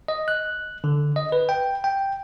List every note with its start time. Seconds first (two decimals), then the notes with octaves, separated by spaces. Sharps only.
0.08 D#5
0.28 F#6
0.84 D3
1.16 D#5
1.32 B4
1.49 G5
1.84 G5